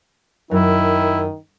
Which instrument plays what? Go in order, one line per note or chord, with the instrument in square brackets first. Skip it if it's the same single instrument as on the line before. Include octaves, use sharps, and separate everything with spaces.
[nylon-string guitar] F#2 [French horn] D#3 [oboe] E4